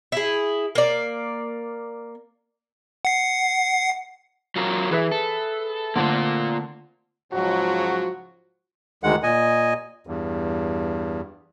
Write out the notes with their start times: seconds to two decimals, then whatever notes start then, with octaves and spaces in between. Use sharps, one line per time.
0.12 E4 G#4
0.75 A#3 D5
3.05 F#5 C7
4.56 F#3 F4 A#4
4.91 E3 G#4 B4 E5
5.12 A4
5.96 D3 A3 A#3 C4 F4
7.32 G#2 C#3 F3 F#3 F#4
9.03 D2 D#3 G#3 F#5
9.23 A#2 D#5 G#5
10.07 E2 G2